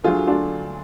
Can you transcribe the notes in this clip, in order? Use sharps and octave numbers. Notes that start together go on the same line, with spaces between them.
D2 D3 F#3 F4 G#4
D4 F4